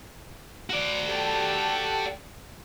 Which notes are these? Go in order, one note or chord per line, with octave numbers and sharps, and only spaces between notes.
F#4 D5
G4 A4